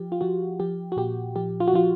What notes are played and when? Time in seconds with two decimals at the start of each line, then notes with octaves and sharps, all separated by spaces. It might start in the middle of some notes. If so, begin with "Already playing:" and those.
Already playing: F3 G4
0.12 F4
0.21 F3 F#4
0.60 F3 G4
0.92 F#4
0.97 A#2 G4
1.36 F3 G4
1.60 F4
1.68 F#4
1.73 F3 F4